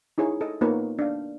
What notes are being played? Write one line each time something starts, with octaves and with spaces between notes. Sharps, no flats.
D#4 E4 G#4 C#5
A4 D#5
A#3 B3 D#4 F4 B4 C#5
D4 F5